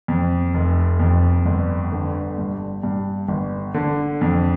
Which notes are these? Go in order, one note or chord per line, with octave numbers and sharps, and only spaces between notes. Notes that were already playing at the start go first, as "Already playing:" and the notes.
F2
F1
F2
G1
D3
G2
G2
G1
D3
F2